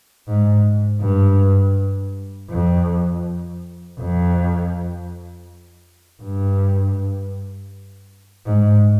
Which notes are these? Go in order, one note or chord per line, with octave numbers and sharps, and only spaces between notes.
G#2
G2
F2
F2
G2
G#2